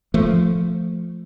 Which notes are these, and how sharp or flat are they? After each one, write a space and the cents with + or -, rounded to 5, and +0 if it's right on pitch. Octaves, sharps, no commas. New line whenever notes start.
F3 -10 A3 +0